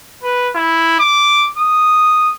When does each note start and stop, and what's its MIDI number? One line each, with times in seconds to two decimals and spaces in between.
0.24 0.49 71
0.56 0.98 64
1.00 1.47 86
1.58 2.32 87